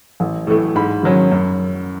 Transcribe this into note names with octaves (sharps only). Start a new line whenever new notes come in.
A1
A2 E3 A3
G#2 B5
D#3 F#3 C#4
F#2